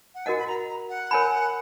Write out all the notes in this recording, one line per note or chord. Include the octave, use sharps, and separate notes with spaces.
F#5
F#4 A#4 D#5 F#5 G#5
B5
A#5
A#5
F#5
A#4 C#5 G#5 B5